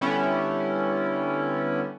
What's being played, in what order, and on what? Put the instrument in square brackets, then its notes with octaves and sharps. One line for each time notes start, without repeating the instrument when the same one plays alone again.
[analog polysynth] D3 G3 B3 C#4 E4